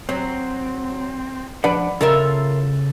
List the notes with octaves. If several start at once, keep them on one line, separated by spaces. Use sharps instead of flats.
F#3 C4
F3 D4 B4 D5 F#5
C#3 F4 A4 A#4 E5